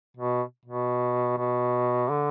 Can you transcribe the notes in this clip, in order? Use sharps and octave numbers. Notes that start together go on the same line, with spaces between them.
B2
B2
B2
D3